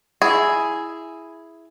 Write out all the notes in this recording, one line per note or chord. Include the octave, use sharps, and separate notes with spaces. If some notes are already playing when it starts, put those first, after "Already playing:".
E4 G#4